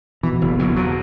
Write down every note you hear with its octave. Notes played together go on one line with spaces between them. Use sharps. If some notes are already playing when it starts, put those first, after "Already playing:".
B2 E3
F#1
E2 F#3
B2 F#3